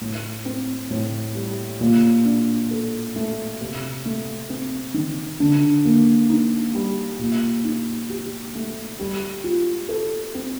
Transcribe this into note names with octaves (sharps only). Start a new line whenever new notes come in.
A2
C4
A2
G3
A#2
D4
A4
A3
C3
A3
C4
D#3
D3
A#3
D#4
G3
A#2
D#4
G4
A3
G3
F4
A4
C4